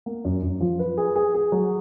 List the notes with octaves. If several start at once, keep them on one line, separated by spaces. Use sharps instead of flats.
A#3
F#2
F#2
F3
B4
G#4
G#4
G#4
F#3